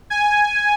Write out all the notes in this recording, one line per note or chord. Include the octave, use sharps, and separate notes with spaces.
G#5